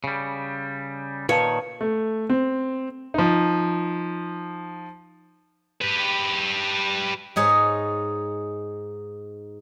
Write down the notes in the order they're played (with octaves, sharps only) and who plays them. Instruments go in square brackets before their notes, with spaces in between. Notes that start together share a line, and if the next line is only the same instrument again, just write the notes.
[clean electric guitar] C#3 G3
[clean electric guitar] A#2 D#3 [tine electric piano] B4 F5 A5 [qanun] C#5
[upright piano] A3
C4
[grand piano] F3 D#4
[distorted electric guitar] G4 B4
[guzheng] G#2 D#4 G#4 C#5